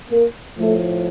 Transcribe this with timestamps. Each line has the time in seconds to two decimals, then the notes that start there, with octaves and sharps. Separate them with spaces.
0.10 A#3
0.57 A2 F3 A3